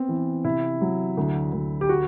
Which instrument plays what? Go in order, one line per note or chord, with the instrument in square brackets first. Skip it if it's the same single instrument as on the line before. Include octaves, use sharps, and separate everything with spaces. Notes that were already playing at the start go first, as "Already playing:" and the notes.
Already playing: [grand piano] B3 C4
E3
C3 E4
F#3
D2
D2
G4
F#4